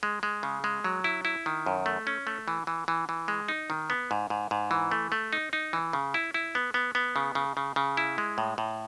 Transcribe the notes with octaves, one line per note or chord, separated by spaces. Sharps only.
G#3
G#3
C#3
G#3
F#3
E4
E4
D#3
F#2
A3
C#4
A3
E3
E3
E3
E3
G#3
D#4
D#3
B3
G#2
G#2
G#2
E3
A3
A3
D#4
D#4
E3
C#3
E4
E4
B3
B3
B3
C#3
C#3
C#3
C#3
E4
G#3
A2
A2